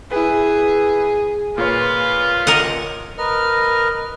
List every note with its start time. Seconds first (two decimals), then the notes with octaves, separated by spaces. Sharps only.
0.12 E4 G#4 B4
1.58 A#2 F4 B4 C#5
2.47 A#4 D#5 F#5
3.18 A#4 B4 D#5 F6